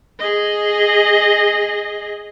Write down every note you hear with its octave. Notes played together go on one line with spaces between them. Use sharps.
G#4 D#5